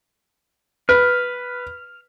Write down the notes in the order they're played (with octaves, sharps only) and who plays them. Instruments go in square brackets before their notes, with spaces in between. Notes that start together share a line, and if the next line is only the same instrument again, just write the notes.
[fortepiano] B4 [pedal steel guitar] F6